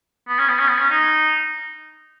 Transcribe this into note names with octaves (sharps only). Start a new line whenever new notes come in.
B3
C#4
B3
C#4
B3
C#4
D#4